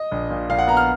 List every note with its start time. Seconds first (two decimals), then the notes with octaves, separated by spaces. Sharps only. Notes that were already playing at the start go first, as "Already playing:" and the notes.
Already playing: D#5
0.12 A#1
0.30 A#2
0.49 A#1 F5
0.59 F#5
0.68 B3 A#5
0.77 F6